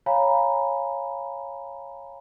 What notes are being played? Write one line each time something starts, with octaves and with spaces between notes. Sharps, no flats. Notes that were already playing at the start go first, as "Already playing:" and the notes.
C#5 F5 G#5 A#5 B5